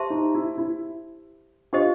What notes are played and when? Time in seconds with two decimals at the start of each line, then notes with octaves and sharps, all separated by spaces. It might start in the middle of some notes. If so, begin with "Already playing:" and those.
Already playing: G4 C5 E5 A5 C6
0.10 D#4
0.34 E4
0.58 E4
1.73 D4 F4 G4 C5 D#5